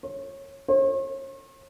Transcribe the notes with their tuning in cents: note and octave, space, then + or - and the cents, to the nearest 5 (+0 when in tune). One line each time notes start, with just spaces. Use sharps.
C#5 -20
C#5 -45